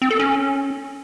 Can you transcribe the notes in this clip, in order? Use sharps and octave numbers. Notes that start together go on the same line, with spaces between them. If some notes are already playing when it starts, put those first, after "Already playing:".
C4
A4
C#4